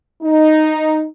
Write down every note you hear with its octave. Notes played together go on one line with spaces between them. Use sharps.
D#4